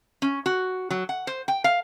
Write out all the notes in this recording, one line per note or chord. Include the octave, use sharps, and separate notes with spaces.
C#4
F#4
F#3
F#5
C5
G5
F5